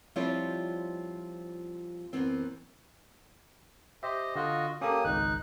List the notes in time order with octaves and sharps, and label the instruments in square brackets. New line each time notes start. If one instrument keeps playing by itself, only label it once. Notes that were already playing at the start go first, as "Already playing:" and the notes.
[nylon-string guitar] F3 G3 C4 E4 F4 C#5
F#2 E3 B3 C4
[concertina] G4 C5 D#5 [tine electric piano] E5
[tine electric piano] D3 [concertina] F4 F#4 D#5
[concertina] A#3 G4 D#6 [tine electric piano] C#4 A4 G5
[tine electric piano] G#1 C#2 [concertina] D#4 F#6